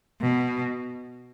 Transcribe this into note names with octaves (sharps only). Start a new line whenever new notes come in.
B2